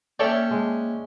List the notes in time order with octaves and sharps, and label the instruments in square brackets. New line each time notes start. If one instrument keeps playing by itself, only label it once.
[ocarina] A#3 [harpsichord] C#4 E5 G5 [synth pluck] A4 C#5 D5
[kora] G#3 D4